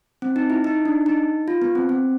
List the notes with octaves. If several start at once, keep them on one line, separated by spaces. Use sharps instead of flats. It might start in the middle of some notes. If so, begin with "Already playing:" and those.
C4
D#4
E4
D#4
D4
D#4
F4
B3
C4
C4